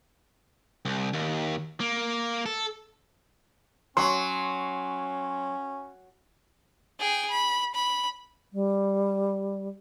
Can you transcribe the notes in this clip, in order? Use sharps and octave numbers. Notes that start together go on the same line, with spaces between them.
C2
D#2
A#3
A4
F#3 C#4 C6 C#6
G#4 G5
B5
B5
G3